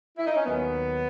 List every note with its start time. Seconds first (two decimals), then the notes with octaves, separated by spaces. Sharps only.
0.17 E4
0.27 D#4
0.35 C#4
0.45 D#2 D#3 F#3 B3